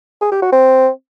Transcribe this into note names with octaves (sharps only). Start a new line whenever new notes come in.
G#4
G4
F#4
C4